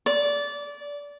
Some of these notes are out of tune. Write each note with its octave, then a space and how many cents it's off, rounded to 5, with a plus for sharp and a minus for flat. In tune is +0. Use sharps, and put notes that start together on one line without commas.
D5 -20